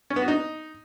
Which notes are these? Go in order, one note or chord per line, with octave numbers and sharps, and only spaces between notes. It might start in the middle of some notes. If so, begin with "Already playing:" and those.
C#4
B3
F#4
D#4